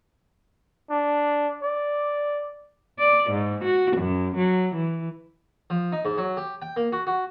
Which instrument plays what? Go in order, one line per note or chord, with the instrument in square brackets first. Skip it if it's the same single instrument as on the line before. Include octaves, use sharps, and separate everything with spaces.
[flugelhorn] D4
D5
[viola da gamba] D5
G#2
F#4
F#2
F#3
E3
[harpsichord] F3
D#4
G#2
F#3
G4
G5
A#3
F#4
F#4